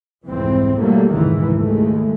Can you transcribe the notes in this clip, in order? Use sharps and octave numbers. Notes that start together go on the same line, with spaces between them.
C2 F2 G#2 E3 C4
B2 F#3 G3 A3 A#3
F1 C#2 G#2 D#3 E3
D#2 G#3 A3